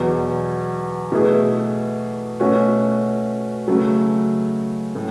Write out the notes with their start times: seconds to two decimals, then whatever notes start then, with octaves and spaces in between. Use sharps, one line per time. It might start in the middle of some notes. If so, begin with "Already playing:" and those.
Already playing: E2 B2 F#3
1.12 B2 A3 E4 G#4 B4
2.40 B2 A3 C#4 F#4
3.68 C#3 F#3 A3
4.95 A2